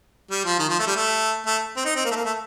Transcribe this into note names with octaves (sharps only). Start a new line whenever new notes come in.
G3
F3
D#3
F3
A3
G3
A3
A3
C4
D#4
C4
A#3
A3
A#3
A3